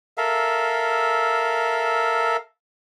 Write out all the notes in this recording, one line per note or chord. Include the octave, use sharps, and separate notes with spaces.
A4 A#4 E5 F5